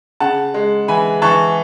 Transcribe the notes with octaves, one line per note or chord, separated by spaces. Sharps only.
C#3 F#5 A5
G#3
E3 G#5 B5
E3 A5 C#6